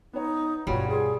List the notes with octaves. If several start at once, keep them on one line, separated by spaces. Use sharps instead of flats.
B3 D#4 C#5
G2 B2 G3 B3 F4 F#4 C#5
F4 G#4 G#5 C6